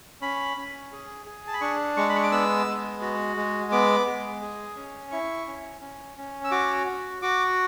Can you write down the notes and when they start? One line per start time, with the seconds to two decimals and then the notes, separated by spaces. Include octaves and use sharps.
0.21 C#4 B5
0.57 C#4
0.92 G#4
1.26 G#4
1.47 A5
1.54 B5
1.61 D4 C#6
1.97 G#3 C#6
2.09 B5
2.16 C#6
2.23 D6
2.32 B3 E6
2.66 G#3
3.01 F#4
3.37 G#3
3.72 B3 D6
4.06 G#3
4.42 G#4
4.76 C#4
5.11 E4 C#6
5.47 C#4
5.81 C#4
6.17 C#4
6.44 E6
6.51 F#4 D6
6.87 F#4
7.22 F#4 D6